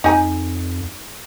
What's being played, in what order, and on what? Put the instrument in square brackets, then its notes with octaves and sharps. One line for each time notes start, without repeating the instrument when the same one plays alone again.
[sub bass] F2 [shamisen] D#4 G#5